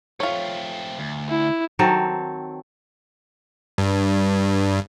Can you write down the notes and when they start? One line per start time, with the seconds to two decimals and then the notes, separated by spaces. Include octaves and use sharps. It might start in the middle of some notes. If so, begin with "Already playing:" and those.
0.20 A3 C4 F4 C#5
0.99 D2
1.29 E4
1.79 D#3 F#3 C4 A4
3.78 G2